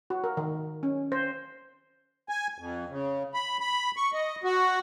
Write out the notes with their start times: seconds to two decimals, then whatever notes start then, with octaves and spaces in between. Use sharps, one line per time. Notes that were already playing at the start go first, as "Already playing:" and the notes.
0.10 F#4
0.24 A#4
0.37 D#3
0.83 C#4
1.12 C5
2.29 G#5
2.58 F2
2.89 C#3
3.34 B5
3.60 B5
3.97 C#6
4.13 D#5
4.44 F#4